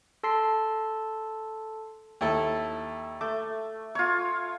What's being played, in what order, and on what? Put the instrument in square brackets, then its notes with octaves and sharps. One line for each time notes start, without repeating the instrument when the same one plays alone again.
[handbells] A4 A5 C6 C7
[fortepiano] D#2 E4 A4
[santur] A3 [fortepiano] D6
[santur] F4 C#5